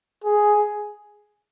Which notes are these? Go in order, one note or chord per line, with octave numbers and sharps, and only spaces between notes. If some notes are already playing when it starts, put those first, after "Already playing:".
G#4